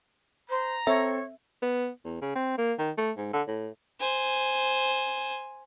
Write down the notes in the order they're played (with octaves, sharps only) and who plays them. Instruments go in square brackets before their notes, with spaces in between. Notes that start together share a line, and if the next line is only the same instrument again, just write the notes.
[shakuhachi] C5 [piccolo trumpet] A#5
[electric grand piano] C4 A4 [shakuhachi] C#5 [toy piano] E5
[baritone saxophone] B3
E2
C#3
C4
A#3
D#3
A3
G#2
D3
A2
[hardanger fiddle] C5 G#5